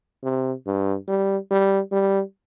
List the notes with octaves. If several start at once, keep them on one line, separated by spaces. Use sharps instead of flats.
C3
G2
G3
G3
G3